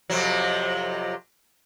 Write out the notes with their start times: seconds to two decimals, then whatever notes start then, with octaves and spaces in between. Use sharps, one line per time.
0.10 F2 C3 F#3